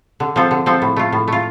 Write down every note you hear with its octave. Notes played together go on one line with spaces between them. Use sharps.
D3
F3 C4 A4
D3
F3 C4 A4
A2
A3 F4
A2
A3 F4